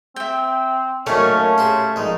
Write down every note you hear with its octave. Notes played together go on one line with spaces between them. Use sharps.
C4 E5 G5
F#2 D#3 A3 A#3 C#4 C#5 F5
C#4
G4 G#4 C5
A#1 G#3 D#4